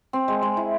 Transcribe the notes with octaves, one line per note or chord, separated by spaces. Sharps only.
C4
G#3
G#3
E4